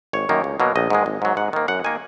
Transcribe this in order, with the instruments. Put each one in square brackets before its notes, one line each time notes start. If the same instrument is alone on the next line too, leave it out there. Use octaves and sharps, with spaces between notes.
[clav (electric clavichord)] G#1 C#5
F#2 D#3 A#3
C#2
B2 F#3 A#3
A#1 D#5
G#2 D#3 G#3
G#1
G#2 F#3
G#2 F#5
D#3 A#3
F#2 F#5
D#3 A#3 G#5